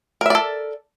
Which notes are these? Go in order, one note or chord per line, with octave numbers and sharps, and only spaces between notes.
A4 A#4 D5 E5